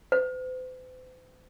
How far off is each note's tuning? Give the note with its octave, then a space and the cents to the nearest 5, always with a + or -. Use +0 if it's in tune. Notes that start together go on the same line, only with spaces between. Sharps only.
C5 -45